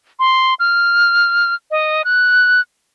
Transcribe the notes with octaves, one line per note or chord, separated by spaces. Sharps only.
C6
F6
D#5
F#6